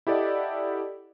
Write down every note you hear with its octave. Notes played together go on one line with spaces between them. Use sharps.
E4 G4 A4 D5 D#5 F#5